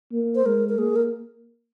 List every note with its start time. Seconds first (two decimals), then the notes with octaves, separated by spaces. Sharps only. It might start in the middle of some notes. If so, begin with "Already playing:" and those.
0.12 A#3
0.35 C5
0.46 G#3 A#4
0.69 A#4
0.78 A#3 G#4
0.96 A#4